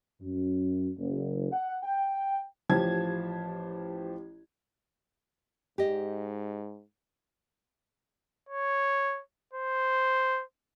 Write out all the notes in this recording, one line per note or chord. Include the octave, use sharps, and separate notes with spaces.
F#2
F#1
F#5
G5
A1 F3 G4 A5 G#6
G#2 G4 D#5
C#5
C5